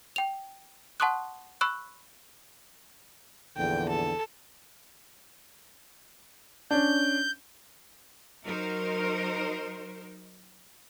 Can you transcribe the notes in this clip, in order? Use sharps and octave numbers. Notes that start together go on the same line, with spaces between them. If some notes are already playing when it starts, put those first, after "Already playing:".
G5 F7
F#5 A5 C6 C#6 D#6 F#6
B5 C#6 E6 F#6
A#1 E2 D3 G5
A4
C#4 D4 G6
F#3 D#4 A#4 C5